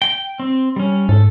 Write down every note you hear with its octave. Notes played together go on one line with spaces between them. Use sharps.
G5
C4
G3 C#4
G#2 A4